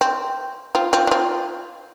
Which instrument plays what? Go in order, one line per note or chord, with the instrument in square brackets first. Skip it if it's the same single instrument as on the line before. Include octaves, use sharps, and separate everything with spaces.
[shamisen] C4
C4 F4
C4 F4
D4
C4 F4